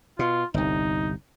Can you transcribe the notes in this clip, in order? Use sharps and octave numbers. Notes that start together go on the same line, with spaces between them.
B2 F4
G1 C2 D#4